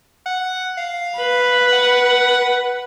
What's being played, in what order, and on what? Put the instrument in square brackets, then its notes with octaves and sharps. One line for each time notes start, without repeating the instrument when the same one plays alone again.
[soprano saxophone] F#5
F5
[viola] B4
[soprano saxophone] F#5